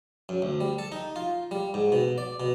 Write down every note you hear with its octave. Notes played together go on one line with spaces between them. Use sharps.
F#2
D2
G3
A4
D#4
F4
G3
G#2
B2
D5
B2